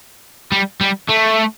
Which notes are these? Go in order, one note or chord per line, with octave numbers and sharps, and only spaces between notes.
G3
G3
A3